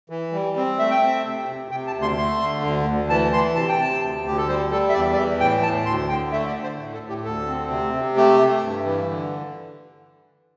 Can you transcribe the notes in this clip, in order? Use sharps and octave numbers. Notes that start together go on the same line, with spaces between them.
E3
G3
C4
A3 E5
G5
C4 E5
C3
C3
C3 G5
A5
D2
C6
A3 C6
D3
D2
D2
E3 A5
E3 C6
C3 A5
G5
C3 A5
D2
D2 G4
A4
G3 C5
G3 A4
E5
E2 D5
D5
E3 E5
A2 G5
A2 A5
D2 C6
D3 G5
A3 E5
D5
D3
C5
A2
A4
A2
G4
D2 A4
C4
C3
C3
A3 G4
A3
G2
E3
D3